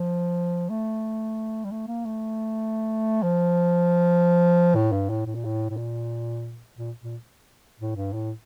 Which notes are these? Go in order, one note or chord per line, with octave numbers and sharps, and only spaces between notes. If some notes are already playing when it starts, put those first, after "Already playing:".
Already playing: F3
A3
G3
A3
A#3
A3
F3
A2
G2
A2
A2
A#2
A2
A2
A#2
A#2
A#2
A2
G2
A2